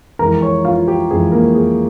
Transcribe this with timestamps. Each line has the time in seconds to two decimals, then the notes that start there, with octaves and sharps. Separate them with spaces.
0.19 F2 E3 G#3 A#4 A#5
0.42 C#5 C#6
0.65 F4 F5
0.88 G4
1.10 F2 E3 G#3 G#4
1.32 A#3 A#4
1.55 G#4